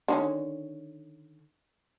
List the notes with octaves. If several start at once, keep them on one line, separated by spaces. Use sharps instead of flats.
D3 D#3 C#4